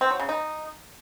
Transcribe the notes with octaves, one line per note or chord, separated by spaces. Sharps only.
C4
F#3
C#3
D#4